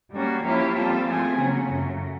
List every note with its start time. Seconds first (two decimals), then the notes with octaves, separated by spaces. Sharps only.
0.12 G3 A#3 C#4 F#4
0.44 F3 A#3 C#4 E4 G4
0.75 G3 C4 F4 A4
1.07 F3 A3 C4 F4 G#4
1.38 C#3 F#3 A#3 C#4
1.69 F#2 C#3 F#3 A3